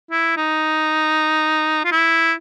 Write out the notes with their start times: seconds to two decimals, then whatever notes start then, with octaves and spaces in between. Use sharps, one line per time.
0.11 E4
0.37 D#4
1.84 F4
1.92 E4